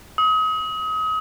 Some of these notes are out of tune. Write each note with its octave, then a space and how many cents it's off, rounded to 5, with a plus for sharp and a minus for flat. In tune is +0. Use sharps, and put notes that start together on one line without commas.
D#6 +35